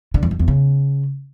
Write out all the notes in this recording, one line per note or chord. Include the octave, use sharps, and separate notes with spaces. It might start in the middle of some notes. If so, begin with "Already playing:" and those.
D3
E2
F2
E2
C#3